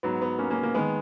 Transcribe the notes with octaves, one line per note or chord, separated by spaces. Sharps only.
G#2 F#3 B3
B3
A#3 C#4
A#3 C#4
A#3
D#3 G#3 B3